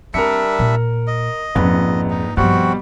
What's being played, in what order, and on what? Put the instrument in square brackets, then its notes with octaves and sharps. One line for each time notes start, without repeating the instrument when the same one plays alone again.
[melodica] G3 D4 E5 [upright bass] C4 [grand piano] A#4 C#7
[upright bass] A#2
[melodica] D#5
[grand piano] A#1 G#2 B4 [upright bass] F2 C#4
[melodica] D#4
[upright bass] G2 F3 [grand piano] B2 G3 [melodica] C4 F#4 F#5